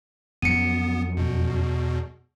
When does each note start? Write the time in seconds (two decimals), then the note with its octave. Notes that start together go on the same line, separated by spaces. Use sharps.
0.42 F2 F#3 B3 C#4 C#7 D#7
1.17 E2 B2